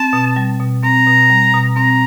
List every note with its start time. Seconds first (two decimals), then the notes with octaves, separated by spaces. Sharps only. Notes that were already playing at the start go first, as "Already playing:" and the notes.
Already playing: C4 A5
0.13 B2
0.36 G3
0.60 B2
0.83 C4 A#5
1.07 B2
1.30 G3
1.54 B2
1.76 C4 A#5